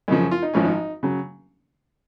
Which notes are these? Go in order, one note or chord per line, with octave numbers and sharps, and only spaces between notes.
F#2 C#3 F3 D#4
F4
D#4
G#1 G#2 F3 C#4
D#4
C#3 F#3